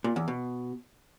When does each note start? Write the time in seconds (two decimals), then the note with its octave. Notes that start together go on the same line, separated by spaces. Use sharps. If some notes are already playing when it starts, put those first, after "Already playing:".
0.04 A#2
0.16 E2
0.28 B2